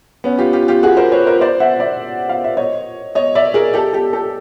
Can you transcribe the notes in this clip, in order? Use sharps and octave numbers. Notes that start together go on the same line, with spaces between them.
B3 C#4
F4 G4
F4 G4
F4 G4
F#4 G#4
A#4 C5
B4 C#5
A#4 C5
C5 D5
E5 F#5
D5 E5
F5
E5
C#5 D#5
C#5 D#5
D5 E5
G#4 A#4
G4 A4
G4 A4
G4 A4